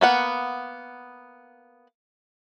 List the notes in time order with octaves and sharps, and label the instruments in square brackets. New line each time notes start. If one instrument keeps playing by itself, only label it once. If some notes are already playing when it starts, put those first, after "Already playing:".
[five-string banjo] A#3 B3 F#5